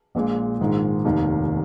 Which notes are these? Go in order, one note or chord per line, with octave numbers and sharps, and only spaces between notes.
A#1 A#2 G#3
A#1 G#2 D#3 G#3
F1 D#2 D#3